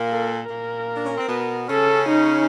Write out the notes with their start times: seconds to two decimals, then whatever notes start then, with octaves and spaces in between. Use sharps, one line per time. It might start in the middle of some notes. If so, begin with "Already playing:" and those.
Already playing: A#2 A#3
0.10 A4
0.49 A#2 A#3 A#4
0.94 D4
1.06 C#4
1.17 C4
1.28 B2 B3
1.68 C#3 C#4 A4
2.08 D#4